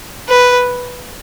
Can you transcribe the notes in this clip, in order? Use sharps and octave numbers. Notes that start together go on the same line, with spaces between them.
B4